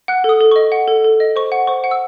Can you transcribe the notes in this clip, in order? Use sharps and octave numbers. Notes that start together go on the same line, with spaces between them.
F#5 F#6
A4
D#6
A4
D#5 C#6
F#5
A4
A4
D#5
C5 C#6
F#5
C5 C#6
F#5
E6